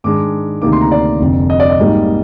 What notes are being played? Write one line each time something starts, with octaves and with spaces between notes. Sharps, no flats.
G#2 D#3 G#3 D4 D6
D2 C3 D#3 A#3 D#4 D6
C6
A#5
D5
F1 F2 D3
D#5
D5
D#5
G#2 G3 A#3 D#4